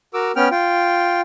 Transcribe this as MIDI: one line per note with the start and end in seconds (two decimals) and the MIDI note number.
0.14 0.32 66
0.14 0.32 70
0.14 0.32 86
0.14 0.32 88
0.36 0.49 59
0.36 0.49 61
0.36 0.49 79
0.36 0.49 89
0.51 1.21 65
0.51 1.21 79